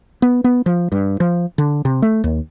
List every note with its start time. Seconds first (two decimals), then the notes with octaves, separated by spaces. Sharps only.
0.22 B3
0.44 B3
0.66 F3
0.92 G2
1.20 F3
1.58 D3
1.85 C3
2.02 A3
2.24 D#2